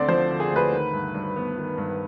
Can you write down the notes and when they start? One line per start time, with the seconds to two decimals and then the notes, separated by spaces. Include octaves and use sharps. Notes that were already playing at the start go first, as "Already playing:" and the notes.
Already playing: D2 D3 C4 D5 C6 D6
0.08 F3 C5
0.30 D3
0.40 G#4
0.51 D2 B4
0.72 D#3
0.93 G2
1.14 G2
1.36 B3
1.57 D#3
1.78 G2